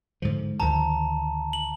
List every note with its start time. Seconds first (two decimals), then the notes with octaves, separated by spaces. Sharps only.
0.22 G#2 D3 F3
0.60 D2 D#3 F3 A5 A#5
1.53 F#7